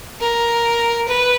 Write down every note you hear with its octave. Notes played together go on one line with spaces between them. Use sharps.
A#4
B4